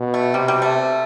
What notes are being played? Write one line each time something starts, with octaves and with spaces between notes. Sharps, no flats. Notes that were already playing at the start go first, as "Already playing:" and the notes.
Already playing: B2
A3
C3 G3
G3
A3